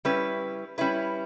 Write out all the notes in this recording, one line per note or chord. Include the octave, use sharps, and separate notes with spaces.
G3 C#4 E4 B4
G3 C#4 E4 B4